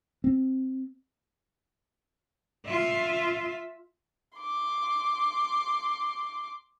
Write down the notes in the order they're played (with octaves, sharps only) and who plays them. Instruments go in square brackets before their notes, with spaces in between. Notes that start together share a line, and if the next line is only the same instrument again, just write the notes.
[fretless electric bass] C4
[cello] F4 E5
[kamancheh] C6 D6